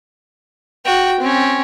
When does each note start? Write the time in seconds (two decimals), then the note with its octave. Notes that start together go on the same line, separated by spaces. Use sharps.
0.85 F#4 G5
1.20 C4 C#4